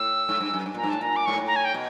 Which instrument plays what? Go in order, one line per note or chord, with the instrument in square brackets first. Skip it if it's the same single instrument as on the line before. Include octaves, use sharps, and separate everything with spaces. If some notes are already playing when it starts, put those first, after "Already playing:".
Already playing: [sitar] A2 [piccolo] E6
[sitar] G#2
G2
F#2
G2
[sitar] A#2 [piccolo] A#5
[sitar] G2
[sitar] A2 [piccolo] A5
[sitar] A#2 [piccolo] A#5
[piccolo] D6
[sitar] G#2 [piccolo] C#6
[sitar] A2
[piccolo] A#5
G#5
G5
[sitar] B2